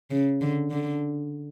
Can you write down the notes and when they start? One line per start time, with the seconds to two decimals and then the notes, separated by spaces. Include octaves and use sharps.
0.10 C#3
0.41 D3
0.71 D3